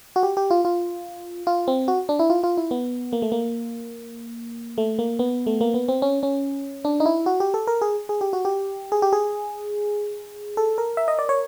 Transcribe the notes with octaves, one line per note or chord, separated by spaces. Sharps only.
F#4
G4
G4
F4
F4
F4
C4
F#4
D4
E4
F4
F4
E4
B3
A#3
A3
A#3
A3
A#3
B3
A3
A#3
B3
C4
C#4
C#4
D4
D#4
E4
F#4
G4
A4
A#4
G#4
G#4
G4
F#4
G4
G#4
G4
G#4
A4
A#4
E5
D#5
D5
C#5